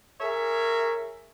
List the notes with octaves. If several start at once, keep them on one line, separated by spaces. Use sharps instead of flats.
G#4 A#4 C#5 E5